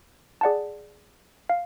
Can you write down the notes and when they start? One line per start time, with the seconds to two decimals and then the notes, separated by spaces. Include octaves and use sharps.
0.41 G#4 D5 F#5 A5
1.50 F5